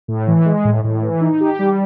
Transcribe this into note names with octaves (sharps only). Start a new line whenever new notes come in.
A2
E3
G#3
A2
A2
E3
D#4
G4
G3